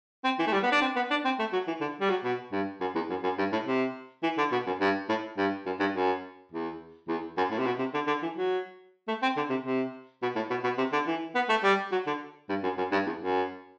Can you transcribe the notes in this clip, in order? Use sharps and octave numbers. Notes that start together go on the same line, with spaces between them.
C4
E3
A3
G3
B3
D4
C4
B3
D4
C4
A3
F#3
E3
D3
G3
F#3
B2
G2
F#2
E2
F#2
F#2
G2
A2
C3
E3
D3
B2
F#2
G2
A2
G2
F#2
G2
F#2
E2
E2
F#2
A2
C3
B2
C3
D3
D3
E3
F#3
A3
C4
D3
C3
C3
B2
A2
B2
B2
C3
D3
E3
B3
A3
G3
F#3
D3
G2
F#2
F#2
G2
E2
F#2